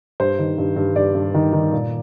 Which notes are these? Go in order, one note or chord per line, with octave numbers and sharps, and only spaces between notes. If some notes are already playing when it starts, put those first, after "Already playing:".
G2 C5
D#3
G2
G2
G2 D5
G2
D#3
D#3
A#2